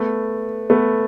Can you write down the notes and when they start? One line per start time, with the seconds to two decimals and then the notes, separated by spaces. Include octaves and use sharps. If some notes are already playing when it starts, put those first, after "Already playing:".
Already playing: A3 B3
0.70 A3 B3